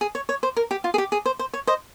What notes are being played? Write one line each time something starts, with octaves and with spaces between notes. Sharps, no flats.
G#4
C#5
C#5
C5
A#4
G4
F4
G#4
G4
G#4
C5
C5
C#5
C5 D#5